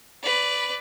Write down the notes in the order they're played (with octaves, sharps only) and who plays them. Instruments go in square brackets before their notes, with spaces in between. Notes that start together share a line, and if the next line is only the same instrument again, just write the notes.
[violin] B4 D5